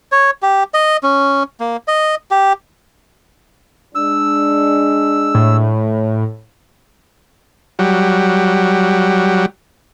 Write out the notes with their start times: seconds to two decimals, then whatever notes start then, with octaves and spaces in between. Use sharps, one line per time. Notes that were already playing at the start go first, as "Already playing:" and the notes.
0.12 C#5
0.42 G4
0.74 D#5
1.03 C#4
1.60 A#3
1.88 D#5
2.31 G4
3.95 G#3 D4 E6
5.35 A2
7.79 F#3 G3